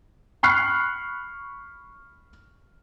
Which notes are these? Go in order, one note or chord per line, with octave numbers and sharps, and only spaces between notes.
B5 C#6 F6 F#6 C7